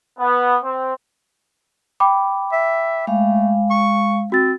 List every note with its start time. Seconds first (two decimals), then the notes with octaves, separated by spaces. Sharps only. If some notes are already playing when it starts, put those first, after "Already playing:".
0.18 B3
0.63 C4
2.00 G5 B5 D6
2.52 E5
3.07 G#3 A3 F5
3.71 C#6
4.32 C4 F#4 A6